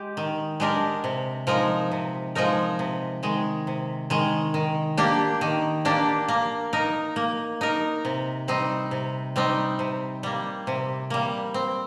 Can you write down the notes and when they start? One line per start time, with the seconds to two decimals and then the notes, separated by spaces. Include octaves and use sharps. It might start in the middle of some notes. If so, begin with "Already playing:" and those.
Already playing: G#3 G4
0.17 D#3
0.60 G#3 D4 G4 A#4
1.04 C3
1.47 F3 G#3 D#4 A#4
1.91 C3
2.35 F3 G#3 D#4 A#4
2.79 C3
3.23 D#3 G#3
3.67 C3
4.10 D#3 G#3
4.54 D#3
4.97 A#3 D4 G4
5.41 D#3
5.85 A#3 D4 G4
6.28 A#3
6.73 D#4 A#4
7.16 A#3
7.61 D#4 A#4
8.05 C3
8.48 G3 C4 D#4
8.91 C3
9.36 G3 C4 D#4
9.79 C3
10.23 G3 A#3
10.67 C3
11.10 G3 A#3
11.54 C4